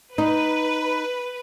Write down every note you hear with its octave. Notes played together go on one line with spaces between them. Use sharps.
D#4 B4